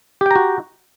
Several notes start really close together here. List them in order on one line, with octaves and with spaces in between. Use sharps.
G4 G5 A#5 F#4